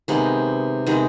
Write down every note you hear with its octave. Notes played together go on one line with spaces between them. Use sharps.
C3 D#3 G#3 B3
C3 D#3 G#3 B3